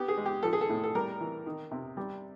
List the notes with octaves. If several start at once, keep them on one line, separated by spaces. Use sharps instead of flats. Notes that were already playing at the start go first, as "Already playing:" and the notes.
Already playing: B3 G4
G#4
G#3
G4
F3 A4
G#4
A4
A2
A4
G3 A#4
E3
D#3
C3
G3